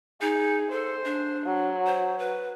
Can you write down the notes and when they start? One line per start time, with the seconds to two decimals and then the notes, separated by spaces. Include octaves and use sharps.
0.21 D#4 G#4
0.72 A4 C5
1.05 D4
1.46 F#3
1.86 C5
2.19 B4